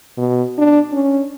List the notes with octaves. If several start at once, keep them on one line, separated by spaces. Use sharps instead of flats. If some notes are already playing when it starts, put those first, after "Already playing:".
B2
D4
C#4